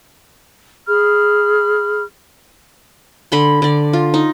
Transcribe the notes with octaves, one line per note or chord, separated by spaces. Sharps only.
G#4 B5 F6
D3 B5 C6
D3 D5
F4
D#4